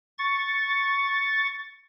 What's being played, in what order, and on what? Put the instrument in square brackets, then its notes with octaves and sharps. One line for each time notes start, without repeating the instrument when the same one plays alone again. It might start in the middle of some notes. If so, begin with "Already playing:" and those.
[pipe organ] C#6 A6